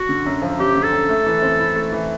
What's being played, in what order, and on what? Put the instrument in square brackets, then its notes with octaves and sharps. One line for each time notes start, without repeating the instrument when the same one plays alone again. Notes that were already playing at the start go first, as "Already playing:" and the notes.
Already playing: [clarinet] F#4
[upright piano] D3
F#2
F3
[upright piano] F#2 [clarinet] G4
[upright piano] D3
[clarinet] A4
[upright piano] F#2
A3
E3
C4
E4
A3
E3